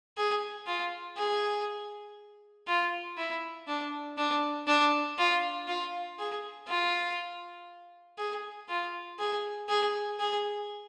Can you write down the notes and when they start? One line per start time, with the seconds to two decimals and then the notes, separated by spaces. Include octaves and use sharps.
0.17 G#4
0.66 F4
1.17 G#4
2.67 F4
3.17 E4
3.67 D4
4.17 D4
4.67 D4
5.18 F4
5.68 F4
6.19 G#4
6.68 F4
8.18 G#4
8.69 F4
9.19 G#4
9.69 G#4
10.19 G#4